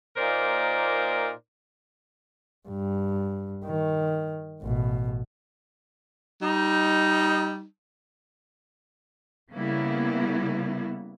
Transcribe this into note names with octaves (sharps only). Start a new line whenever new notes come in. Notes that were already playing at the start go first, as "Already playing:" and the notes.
A#2 A#3 D#4 A#4 C5 D5
G2
D#3
A1 B2
G3 D#4
C#3 G3 A#3 B3 E4